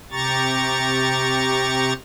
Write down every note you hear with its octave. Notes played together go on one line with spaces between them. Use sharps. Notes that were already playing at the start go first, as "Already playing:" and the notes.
C3 G4 A#5 C#6 A6